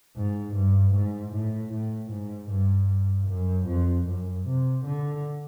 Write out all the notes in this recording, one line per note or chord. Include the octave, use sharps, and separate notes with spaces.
G#2
G2
G#2
A2
A2
G#2
G2
F#2
F2
F#2
C3
D3